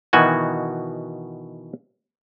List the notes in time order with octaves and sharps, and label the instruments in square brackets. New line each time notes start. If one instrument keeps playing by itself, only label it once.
[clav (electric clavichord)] B2 D#3 E3 F#4 G#5